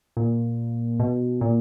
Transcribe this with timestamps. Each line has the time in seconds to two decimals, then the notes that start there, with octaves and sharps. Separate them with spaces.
0.17 A#2
0.99 B2
1.41 A#2